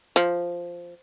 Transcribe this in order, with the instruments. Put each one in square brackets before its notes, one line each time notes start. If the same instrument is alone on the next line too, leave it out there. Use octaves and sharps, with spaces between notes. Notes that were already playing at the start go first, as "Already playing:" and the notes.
[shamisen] F3